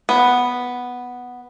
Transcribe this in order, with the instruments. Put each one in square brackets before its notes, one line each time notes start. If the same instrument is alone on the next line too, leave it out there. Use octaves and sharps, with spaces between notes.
[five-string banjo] B3